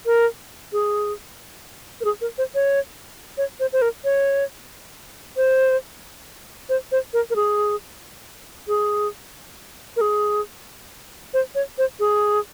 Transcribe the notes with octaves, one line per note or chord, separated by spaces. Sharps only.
A#4
G#4
A#4
G#4
A#4
C5
C#5
C#5
C5
C5
A#4
C#5
C5
C5
C5
A#4
A#4
G#4
G#4
A#4
G#4
C5
C#5
C5
G#4